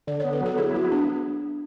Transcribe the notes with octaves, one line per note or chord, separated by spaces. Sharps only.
D3 D5
B3 C#5
B4
F#3
A4
E4 G#4
B3 F#4
B3 D4